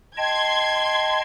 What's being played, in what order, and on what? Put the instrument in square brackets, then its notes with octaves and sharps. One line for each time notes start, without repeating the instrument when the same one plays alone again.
[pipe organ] D#5 G5 A5 [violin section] C6 G#6